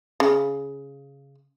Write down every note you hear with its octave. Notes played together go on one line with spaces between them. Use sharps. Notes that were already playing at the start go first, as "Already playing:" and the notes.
C#3